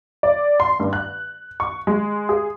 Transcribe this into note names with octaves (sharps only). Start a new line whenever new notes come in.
D5
C6
G2
F#6
C#6
G#3
G#4